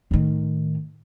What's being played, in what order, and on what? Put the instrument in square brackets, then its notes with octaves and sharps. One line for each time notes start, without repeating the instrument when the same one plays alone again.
[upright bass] A2 D#3